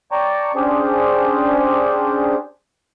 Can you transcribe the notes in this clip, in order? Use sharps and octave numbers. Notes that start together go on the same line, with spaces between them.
C#5 D5 G5 A5 A#5 C#6
C#4 D4 G4 G#4 C5